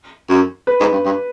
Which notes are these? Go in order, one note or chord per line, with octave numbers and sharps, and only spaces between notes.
F#2
B4
G#2
G2
G2